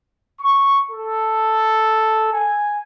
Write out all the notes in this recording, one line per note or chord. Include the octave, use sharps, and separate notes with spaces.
C#6
A4
G#5